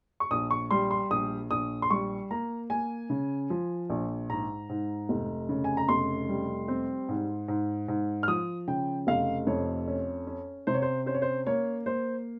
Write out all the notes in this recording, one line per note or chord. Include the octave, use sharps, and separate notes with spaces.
C#6
A#1 D#6
C#6
G3 C6
C6
A#1 D#6
A#1 D#6
C6
G3 C#6
A#3 A#5
A#3 G#5
C#3
F3
A#1
G#2 A#5
G#2
F1
C#3
G#5
A#5
F1 C6
G3
C4
G#2
G#2
G#2
F6
F3 D#6
C#3 G5
F1 F5
F2 C#5
C#4
C#4
C3 C5
C#5
C5
C#4 C5
C#5
C5
A#3 C#5
A#3 C5